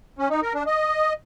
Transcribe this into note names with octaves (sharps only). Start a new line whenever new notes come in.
C#4
D#4
A#4
D4
D#5